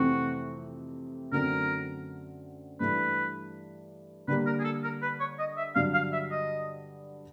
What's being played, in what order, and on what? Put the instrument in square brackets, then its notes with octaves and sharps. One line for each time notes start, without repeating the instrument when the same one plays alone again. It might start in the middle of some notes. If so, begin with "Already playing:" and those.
Already playing: [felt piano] F2 C3 E3 A3 C4 [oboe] F#4
[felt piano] F#2 D3 F#3 A3 C4 [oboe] A#4
[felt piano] G2 E3 A3 [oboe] B4
[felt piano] D3 G3 A#3 [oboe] B4
[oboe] A#4
G#4
A4
A#4
B4
C#5
D#5
E5
[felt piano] G2 D3 F#3 [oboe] F5
[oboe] F5
E5
D#5